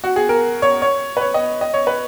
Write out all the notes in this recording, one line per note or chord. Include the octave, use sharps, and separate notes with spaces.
F#4
G#4
A#4
C#5
C#5
B4
C#5
D#5
D#5
C#5
B4